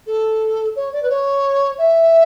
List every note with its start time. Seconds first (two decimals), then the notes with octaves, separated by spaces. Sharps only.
0.06 A4
0.76 C#5
0.92 D5
1.02 B4
1.09 C#5
1.78 E5